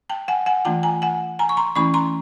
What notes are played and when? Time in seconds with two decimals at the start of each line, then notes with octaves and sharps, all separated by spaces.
0.09 G5 A5
0.28 F#5 G#5
0.46 F#5 G#5
0.65 E3 A3 D4 F4 G5 A5
0.83 G#5 A#5
1.02 F#5 G#5
1.39 G#5 A#5
1.49 C#6
1.57 A#5 C6
1.76 E3 A3 C#4 E4 B5 C#6
1.94 A#5 C6